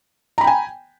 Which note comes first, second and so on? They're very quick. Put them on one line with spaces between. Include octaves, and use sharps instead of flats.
A#5 B5 G5 G#5